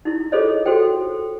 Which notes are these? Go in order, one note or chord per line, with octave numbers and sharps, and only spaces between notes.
D#4 E4
F4 G#4 A4 C5 C#5 D#5
F#4 A4 C5 G5